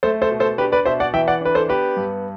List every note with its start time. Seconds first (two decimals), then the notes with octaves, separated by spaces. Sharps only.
0.03 A3 A4 C5
0.22 A4 C5
0.31 B2
0.40 A4 C5
0.58 D4 G4 B4
0.72 B4 D5
0.86 B2 C5 E5
1.00 D5 F#5
1.14 E3 E5 G5
1.27 D5 F#5
1.41 D4 B4
1.55 A4 C5
1.69 B3 G4 B4
1.97 G2